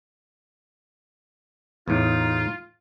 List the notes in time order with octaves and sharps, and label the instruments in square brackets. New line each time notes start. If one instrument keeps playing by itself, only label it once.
[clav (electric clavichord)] E2 A2 [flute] D#4 [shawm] F4